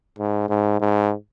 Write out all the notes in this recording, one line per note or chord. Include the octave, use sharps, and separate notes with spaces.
G#2
G#2
G#2